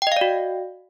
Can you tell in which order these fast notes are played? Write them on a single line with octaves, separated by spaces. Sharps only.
G5 D#5 F5 D5 F#4